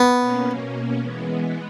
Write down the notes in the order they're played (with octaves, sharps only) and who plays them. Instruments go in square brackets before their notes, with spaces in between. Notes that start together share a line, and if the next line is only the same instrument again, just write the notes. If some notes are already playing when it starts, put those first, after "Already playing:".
Already playing: [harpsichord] B3
[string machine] B2 A#3 C#4
E3 G#3 B3